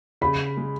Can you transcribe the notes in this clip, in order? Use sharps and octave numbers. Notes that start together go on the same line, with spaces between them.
C#3 B5
G#3